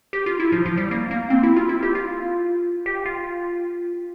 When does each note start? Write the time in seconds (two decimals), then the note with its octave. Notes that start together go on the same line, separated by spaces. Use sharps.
0.13 G4
0.26 F4
0.40 E4
0.52 F3
0.65 F3
0.77 G3
0.91 A#3
1.11 A#3
1.30 C4
1.43 E4
1.56 F4
1.69 E4
1.83 G4
1.95 F4
2.86 G4
3.06 F4